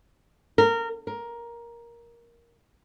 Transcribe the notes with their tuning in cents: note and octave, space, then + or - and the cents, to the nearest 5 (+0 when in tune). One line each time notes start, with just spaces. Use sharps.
A#4 -20
A#4 +10